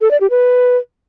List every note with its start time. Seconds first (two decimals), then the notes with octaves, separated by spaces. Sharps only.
0.01 A4
0.11 D5
0.21 G4
0.30 B4